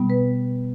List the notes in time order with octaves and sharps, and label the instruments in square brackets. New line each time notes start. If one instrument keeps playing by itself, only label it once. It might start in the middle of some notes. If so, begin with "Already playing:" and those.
Already playing: [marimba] B2 G3 B3
B4